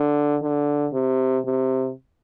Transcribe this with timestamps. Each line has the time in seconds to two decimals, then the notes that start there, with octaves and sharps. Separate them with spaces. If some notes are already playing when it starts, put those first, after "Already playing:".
Already playing: D3
0.42 D3
0.93 C3
1.45 C3